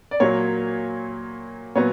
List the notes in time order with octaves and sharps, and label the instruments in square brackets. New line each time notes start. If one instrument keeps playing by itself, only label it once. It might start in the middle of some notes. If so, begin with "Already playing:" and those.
[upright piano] D5
A#2 F#3 A#3 C#5
A#2 F#3 B3 C#5